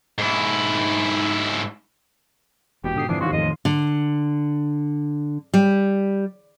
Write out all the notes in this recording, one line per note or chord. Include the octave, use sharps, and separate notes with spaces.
G#2 E4
E1 B2 G4
G#2 D3 D#6 C7
F2 D3 E3 F3 D4
A1 D#2 D#3 F#4 F5 C6
F2 A2 D#5
D3
G3